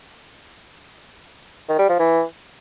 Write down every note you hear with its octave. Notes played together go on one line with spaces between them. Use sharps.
D#3
G3
F3
E3